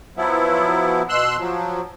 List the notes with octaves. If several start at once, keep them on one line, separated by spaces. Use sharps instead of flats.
F3 F#3 B3 E4
B2 C6 E6 F#6
F3 F#3